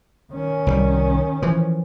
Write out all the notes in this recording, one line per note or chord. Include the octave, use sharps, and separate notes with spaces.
D#3 C#4
C2 E3 G3
E3 F3